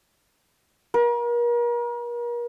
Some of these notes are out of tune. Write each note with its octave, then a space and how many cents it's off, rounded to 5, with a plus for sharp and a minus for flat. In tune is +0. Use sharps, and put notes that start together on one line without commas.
A#4 +40